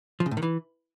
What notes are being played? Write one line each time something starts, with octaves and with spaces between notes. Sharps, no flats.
F3
C#3
A2
D#3
E3